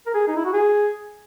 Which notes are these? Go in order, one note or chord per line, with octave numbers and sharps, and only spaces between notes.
A#4
G#4
D#4
E4
F#4
G#4